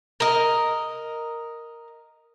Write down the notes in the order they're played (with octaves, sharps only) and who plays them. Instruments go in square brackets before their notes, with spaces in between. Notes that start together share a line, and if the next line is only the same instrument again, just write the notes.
[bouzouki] A#4 D#5